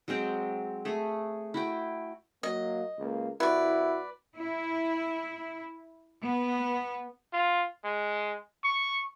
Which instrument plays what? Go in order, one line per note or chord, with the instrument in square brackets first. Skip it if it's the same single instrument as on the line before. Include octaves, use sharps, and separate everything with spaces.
[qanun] F#3 G#3 C4 G5
A3 G#4
E4 F#4 G5
[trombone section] F#3 A#3 [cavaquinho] D#5
[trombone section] C#2 A#3
[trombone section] C2 F#4 [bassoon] E4 [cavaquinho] B4 D5
[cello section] E4
B3
[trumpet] F4
G#3
C#6